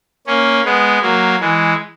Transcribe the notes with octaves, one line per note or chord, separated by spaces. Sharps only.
A#3 C#4
G#3 B3
F#3 A#3
E3 G#3